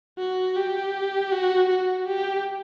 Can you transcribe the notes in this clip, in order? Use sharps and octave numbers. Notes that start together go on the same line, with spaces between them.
F#4
G4
F#4
F#4
G4